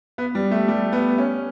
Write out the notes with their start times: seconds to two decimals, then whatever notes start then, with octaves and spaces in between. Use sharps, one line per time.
0.18 B3
0.35 G3
0.51 A3
0.68 G3
0.92 B3
1.18 C#4